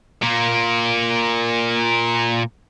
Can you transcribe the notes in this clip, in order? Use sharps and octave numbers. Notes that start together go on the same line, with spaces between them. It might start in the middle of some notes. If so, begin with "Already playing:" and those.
A#2 A#3